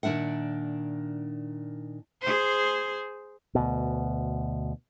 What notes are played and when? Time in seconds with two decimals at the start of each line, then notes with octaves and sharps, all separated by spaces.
0.03 A#2 D#3 A#3 D4 E5 F#5
2.22 G#4 C5
3.55 D2 B2